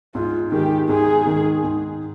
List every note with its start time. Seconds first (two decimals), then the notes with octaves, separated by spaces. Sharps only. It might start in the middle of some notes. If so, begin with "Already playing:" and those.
0.15 G#2 F4
0.52 D#3 G#3 G4
0.89 G#2 G#4
1.26 D#3 G#3
1.63 G#2